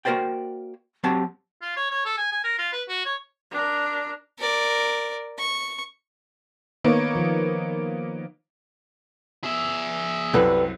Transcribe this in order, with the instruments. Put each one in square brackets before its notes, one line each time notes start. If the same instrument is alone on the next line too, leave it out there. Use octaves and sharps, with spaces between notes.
[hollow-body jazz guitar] A#3 F#4 A#4 C5 D5 G5
F#3 C4 G4 A5
[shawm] F4
C#5
C#5
A4
G#5
G#5
A#4
F4
B4
F#4
C#5
[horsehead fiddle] D4 A#4
[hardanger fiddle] A#4 D5
C#6
[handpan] D#3 C#5 [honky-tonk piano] A#3 B3 D#4
[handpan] D#3 F3
[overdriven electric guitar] G#4 E5
[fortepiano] C2 F#2 F#6 [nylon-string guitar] G3 A4 B4